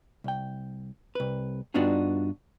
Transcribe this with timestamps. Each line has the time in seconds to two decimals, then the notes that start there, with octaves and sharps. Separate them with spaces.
0.24 C2 G5
1.15 C2 B4
1.74 G2 B3 D4 D#4 F4 F#4